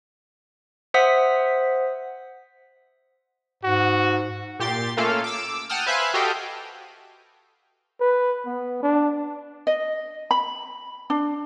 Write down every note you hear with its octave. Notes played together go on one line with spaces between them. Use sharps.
C5 E5 F#5 D#6 B6
G#2 F#4
A#2 G4 C6 A6
A3 A#3 C#4 F4 A4 F5
D6 E6
F#5 G5 A5 D#6 F6
B4 C5 E5 F5 G#5 F#6
F#4 G4 A4 D#5 F5 G5
B4
B3
D4
D#5
B5
D4